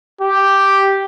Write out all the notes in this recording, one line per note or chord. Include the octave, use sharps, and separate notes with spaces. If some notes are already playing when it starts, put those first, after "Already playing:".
G4